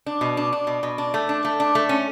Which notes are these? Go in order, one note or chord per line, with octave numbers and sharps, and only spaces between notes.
D4
B2
D4
D4
B2
B2
D4
A3
D4
A3
D4
A3
C#4